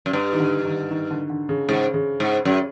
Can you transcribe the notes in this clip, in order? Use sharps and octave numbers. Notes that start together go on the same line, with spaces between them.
F#2
G2
D#3
D3
D#3
D#3
D3
D3
C#3
G#2 C#3
C#3
G#2
F#2